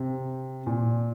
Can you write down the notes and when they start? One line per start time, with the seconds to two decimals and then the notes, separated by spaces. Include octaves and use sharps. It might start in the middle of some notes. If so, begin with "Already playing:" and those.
Already playing: C3
0.66 A#2